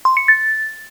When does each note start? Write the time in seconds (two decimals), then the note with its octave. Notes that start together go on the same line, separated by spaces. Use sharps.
0.05 C6
0.17 C#7
0.28 A6